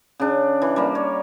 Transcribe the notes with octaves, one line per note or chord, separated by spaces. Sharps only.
C#3 D4
E3
G3 A#3
C#5